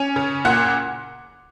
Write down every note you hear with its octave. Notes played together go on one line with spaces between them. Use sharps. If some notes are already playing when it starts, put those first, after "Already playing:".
Already playing: C#4 G#5
C#3
A#2 F#5